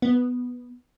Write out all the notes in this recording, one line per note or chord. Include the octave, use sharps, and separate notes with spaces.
B3